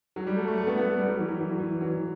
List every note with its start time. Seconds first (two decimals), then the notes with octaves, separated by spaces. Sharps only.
0.16 F#3
0.27 G3
0.37 A3
0.47 A3
0.57 A3
0.67 B3
0.78 B3
0.88 A3
0.98 G3
1.08 F#3
1.19 E3
1.28 F#3
1.40 E3
1.49 F#3
1.59 E3
1.81 F#3
1.90 E3